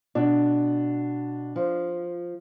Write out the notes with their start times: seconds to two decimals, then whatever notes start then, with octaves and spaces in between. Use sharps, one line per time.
0.15 B2 D4
1.56 F3